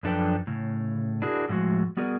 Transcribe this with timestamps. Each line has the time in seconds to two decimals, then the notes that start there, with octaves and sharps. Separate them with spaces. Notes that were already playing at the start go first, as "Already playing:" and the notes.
0.03 F#2 F3 D4 A4 B4 G5
0.47 A2 C#3
1.22 D4 E4 F#4 G#4 A#4
1.49 A2 F3 G#3 F#4
1.97 G3 B3 F#4 G#4 A#4 D5